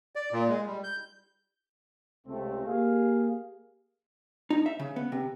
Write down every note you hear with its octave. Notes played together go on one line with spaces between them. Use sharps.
D5
A#2
G#3
G3
G6
C#2 C3 A3 C4
A#3 G4 G#4 F5
D#4
E5
C#3
B3
C3